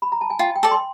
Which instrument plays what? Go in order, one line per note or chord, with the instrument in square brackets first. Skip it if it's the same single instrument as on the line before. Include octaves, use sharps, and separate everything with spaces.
[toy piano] B5
A#5
A5
G#5
[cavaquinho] F4 [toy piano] G5
[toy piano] G5
[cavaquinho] A4 D5
[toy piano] C6